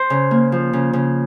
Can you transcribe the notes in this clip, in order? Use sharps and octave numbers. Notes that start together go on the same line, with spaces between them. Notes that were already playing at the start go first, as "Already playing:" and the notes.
Already playing: C5
C#3
A#3
F3
C#3
C#3